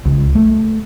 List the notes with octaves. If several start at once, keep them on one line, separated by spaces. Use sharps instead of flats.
C#2
A3